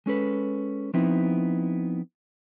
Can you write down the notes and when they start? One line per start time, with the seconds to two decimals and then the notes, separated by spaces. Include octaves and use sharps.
0.06 G#3 C#4 A4 B4
0.94 F3 B3 C4 D#4 E4